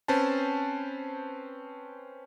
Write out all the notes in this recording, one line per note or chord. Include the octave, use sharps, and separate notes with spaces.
C4 C#4 B4 C5 A5